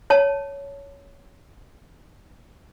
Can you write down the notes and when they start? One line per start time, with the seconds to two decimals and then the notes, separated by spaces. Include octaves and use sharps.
0.10 C#5 A5